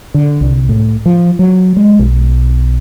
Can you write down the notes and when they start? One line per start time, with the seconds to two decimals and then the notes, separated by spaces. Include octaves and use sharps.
0.14 D3
0.41 C2
0.69 A2
1.06 F3
1.39 F#3
1.77 G#3
1.99 B1